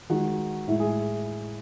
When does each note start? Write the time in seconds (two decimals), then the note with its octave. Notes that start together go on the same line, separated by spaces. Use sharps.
0.10 D#3 G#3 F#4
0.68 A2 G#3 E4
0.80 G#4